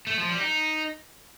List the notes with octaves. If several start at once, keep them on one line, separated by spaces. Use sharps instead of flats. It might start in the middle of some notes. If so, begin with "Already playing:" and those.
A3
F3
G3
D#4